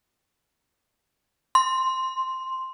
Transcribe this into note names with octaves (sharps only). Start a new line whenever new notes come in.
C6